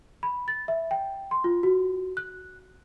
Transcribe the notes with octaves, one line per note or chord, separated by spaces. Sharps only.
B5
A6
E5
G5
C6
F4
F#4
F#6